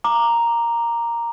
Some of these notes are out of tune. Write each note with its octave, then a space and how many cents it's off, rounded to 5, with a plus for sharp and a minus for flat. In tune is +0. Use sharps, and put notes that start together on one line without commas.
A#5 +0 D6 +10